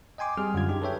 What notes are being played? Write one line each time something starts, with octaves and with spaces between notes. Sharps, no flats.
D#5 G5 G#5 C6 D6
G3 C4 G#4 F6
F#2 D3 F#3 F4 G#6
D4 D#4 G4 G#4
A4 B4 C#5 E5 G5